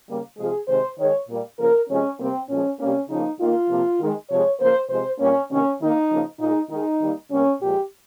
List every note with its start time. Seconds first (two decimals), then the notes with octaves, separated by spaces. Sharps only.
0.09 C#3 G3 A#3
0.38 C3 F3 G#3 G#4
0.68 C3 D#3 G#3 C5
0.98 D#3 G#3 C#5
1.28 A#2 G3 A#3
1.59 C#3 F3 A#3 A#4
1.88 C3 F3 G#3 C#4
2.19 C3 G3 A#3 C4
2.49 A#2 F3 G#3 C#4
2.79 C3 G3 A#3 C#4
3.09 C#3 F3 A#3 D#4
3.39 D#3 A#3 F4
3.70 C3 F3 A#3
4.00 D#3 G#3
4.29 C3 F3 G#3 C#5
4.59 C#3 F3 A#3 C5
4.90 C3 F3 G#3 C5
5.20 A#2 G3 A#3 C#4
5.50 C3 D#3 A#3 C#4
5.81 D#3 A#3 D#4
6.10 C#3 F3 A#3
6.40 A#2 G#3 D#4
6.70 D#3 G#3 D#4
7.01 D#3 G3 A#3
7.30 C3 G3 A#3 C#4
7.60 A#2 F3 G#3 G4